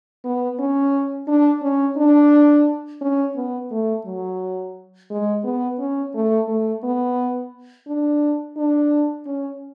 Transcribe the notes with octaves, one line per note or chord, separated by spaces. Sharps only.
B3
C#4
D4
C#4
D4
C#4
B3
A3
F#3
G#3
B3
C#4
A3
A3
B3
D4
D4
C#4